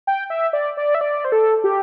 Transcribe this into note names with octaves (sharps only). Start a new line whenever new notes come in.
G5
E5
D5
D5
E5
D5
C5
A4
G4